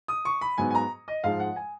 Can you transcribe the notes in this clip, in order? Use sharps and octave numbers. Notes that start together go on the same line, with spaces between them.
D#6
C#6
B5
G#2 F#3 B3 G#5
G#5
A#5
D#5
G#2 F3 G#3 F5
F#5
G#5